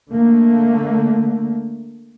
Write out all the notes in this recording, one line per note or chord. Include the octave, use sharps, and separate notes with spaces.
D3 A3 A#3